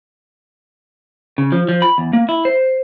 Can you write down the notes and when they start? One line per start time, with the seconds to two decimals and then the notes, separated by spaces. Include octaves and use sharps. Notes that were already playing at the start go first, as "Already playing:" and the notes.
1.38 C#3
1.52 F3
1.69 F3
1.82 B5
1.98 E2
2.13 A#3
2.29 E4
2.45 C5